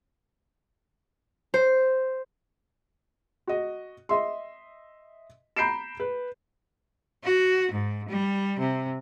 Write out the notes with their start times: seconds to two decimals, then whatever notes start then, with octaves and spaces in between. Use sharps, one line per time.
1.54 C5
3.47 F#4 D#5
4.09 D#5 E5 C6
5.57 A#5 B5 G6 C7 D7 E7
6.00 B4
7.23 F#4
7.72 G#2
8.09 G3
8.59 C3